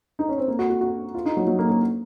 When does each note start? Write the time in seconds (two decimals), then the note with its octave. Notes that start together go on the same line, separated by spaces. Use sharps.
0.19 D#4
0.29 C#4
0.38 C4
0.48 A#3
0.59 F#4
0.70 F#4
0.81 F#4
1.15 F4
1.26 D#4
1.37 F#3
1.47 F#3
1.59 A#3
1.70 A#3